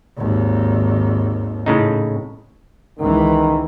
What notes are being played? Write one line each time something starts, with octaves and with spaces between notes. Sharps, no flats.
G#1 D#2
A2 C#3 D#4
C#2 D#3 E3